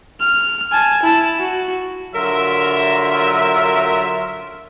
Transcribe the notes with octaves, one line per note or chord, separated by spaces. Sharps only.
F6
G#5 A5
E4 A5
F#4
D3 F#3 F4 A#4 E5